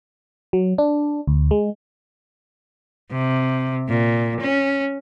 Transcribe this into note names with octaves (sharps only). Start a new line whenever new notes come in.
F#3
D4
D2
G#3
C3
A#2
C#4